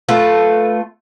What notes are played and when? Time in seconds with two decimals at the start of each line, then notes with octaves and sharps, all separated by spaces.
0.08 A3 F4 B4